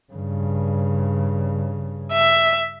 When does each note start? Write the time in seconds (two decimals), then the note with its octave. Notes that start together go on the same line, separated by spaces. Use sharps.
0.13 G2 C#3
2.13 E5